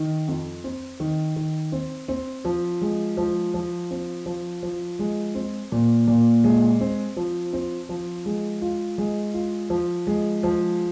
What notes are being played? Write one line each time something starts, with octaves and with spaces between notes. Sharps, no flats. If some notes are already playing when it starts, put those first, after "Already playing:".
Already playing: D#3
F2
C4
D#3
D#3
C4
C4
F3
G#3
F3
F3
C4
F3
F3
G#3
C4
A#2
A#2
G#3
C4
F3
C4
F3
G#3
F4
G#3
F4
F3
G#3
F3